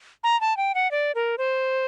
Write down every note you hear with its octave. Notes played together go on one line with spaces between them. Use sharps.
A#5
A5
G5
F#5
D5
A#4
C5